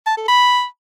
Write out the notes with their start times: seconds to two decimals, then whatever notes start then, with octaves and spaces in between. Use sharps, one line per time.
0.06 A5
0.17 A4
0.28 B5